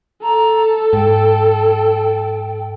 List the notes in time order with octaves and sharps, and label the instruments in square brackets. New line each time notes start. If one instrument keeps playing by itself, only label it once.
[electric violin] A4 [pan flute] A#5
[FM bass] G#2 [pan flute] G5